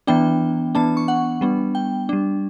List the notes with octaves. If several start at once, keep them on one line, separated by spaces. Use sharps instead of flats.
E3 B3 D4 G5
E3 B3 D4 A5
C#6
F#5
G3 B3 D4
G5
G3 D4